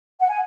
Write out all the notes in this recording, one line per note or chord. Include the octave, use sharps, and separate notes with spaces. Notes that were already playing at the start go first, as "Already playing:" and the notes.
F#5
G#5